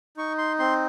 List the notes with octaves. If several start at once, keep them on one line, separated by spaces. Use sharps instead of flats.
D#4 C#6
C6
C4 C6